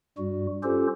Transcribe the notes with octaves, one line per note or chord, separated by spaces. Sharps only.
G2 G3 F#4
C#4 F4 G4 A4 C5